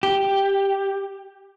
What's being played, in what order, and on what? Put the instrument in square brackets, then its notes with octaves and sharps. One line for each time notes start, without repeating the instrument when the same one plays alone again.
[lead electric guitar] G4